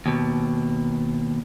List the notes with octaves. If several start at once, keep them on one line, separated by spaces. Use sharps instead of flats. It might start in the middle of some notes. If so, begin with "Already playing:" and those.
D#2 B2